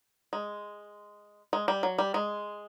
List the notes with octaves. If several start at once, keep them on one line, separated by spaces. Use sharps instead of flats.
G#3
G#3
G3
F#3
G3
G#3